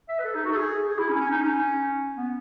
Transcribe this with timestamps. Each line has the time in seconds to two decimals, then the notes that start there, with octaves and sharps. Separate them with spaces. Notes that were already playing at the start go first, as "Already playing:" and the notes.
0.09 E5
0.19 B4
0.24 A4
0.35 D#4
0.45 F#4
0.51 A4
0.56 G#4
0.89 G#4
0.99 E4
1.09 C#4
1.20 C#4
1.31 D#4
1.41 C#4
2.17 B3